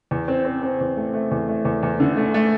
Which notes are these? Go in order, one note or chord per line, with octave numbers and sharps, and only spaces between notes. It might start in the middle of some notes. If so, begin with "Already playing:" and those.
E2
C4
C4
C4
E2
A3
A3
E2
A3
E2
E2
D3
A3
A3